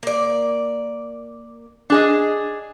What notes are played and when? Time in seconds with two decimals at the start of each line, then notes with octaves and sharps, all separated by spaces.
0.03 A#3 D5
1.90 D4 G#4 D#5